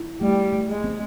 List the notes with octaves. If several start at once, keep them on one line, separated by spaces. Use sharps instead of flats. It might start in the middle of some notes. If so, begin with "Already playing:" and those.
Already playing: E4
G3 A3
A3
G#3
C4